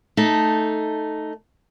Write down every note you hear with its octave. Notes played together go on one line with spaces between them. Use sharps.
A3 D#4